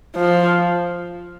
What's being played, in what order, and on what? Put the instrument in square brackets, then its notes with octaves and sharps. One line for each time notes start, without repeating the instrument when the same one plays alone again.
[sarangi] F3